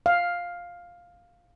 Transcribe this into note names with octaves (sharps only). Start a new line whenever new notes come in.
F5